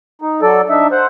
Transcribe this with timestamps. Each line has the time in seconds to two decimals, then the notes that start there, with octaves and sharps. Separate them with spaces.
0.22 D#4
0.42 F#3 A4 D5
0.70 D4 D#4 E5
0.91 C5 F#5